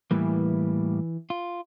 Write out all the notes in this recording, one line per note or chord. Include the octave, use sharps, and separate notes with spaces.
A2 E3 G3 A#3
F4